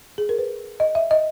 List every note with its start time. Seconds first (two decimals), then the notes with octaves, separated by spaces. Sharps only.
0.18 G#4
0.29 A#4
0.38 B4
0.80 D#5
0.95 E5
1.11 D#5